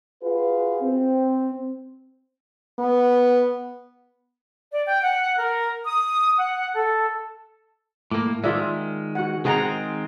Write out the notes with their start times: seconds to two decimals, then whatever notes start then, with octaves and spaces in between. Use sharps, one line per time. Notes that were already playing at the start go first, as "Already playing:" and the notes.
0.23 F4 F#4 G#4 B4
0.81 C4
2.79 B3
4.73 D5
4.86 G5
5.02 F#5
5.37 A#4
5.84 D#6
6.37 F#5
6.75 A4
8.11 A2 A#3 D6
8.44 D#3 G#3 F4 D5 E5
9.15 F#4 F#5
9.45 D#3 G#3 C4 G#4 F#5 A#5